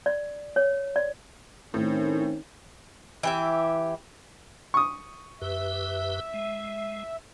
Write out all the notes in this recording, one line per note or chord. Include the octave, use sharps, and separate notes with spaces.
D5
C#5
D5
A2 D#3 C4 C#4
E3 G4 E5
C#6 D#6
F#2 G4 B4 E5
G#3